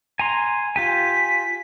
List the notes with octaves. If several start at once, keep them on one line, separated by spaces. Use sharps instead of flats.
G#5 A#5 C6
F4 G4 G#5 B6